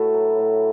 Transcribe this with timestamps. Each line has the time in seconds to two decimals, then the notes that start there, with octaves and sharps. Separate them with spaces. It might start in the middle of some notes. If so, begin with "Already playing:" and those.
Already playing: A2 A3 F#4 A4 B4
0.14 F#3
0.39 A2